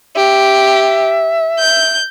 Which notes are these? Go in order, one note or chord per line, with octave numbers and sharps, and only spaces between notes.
G4 E5
G6